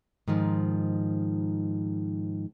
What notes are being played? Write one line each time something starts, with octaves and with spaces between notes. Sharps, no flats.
G#2 D#3 F3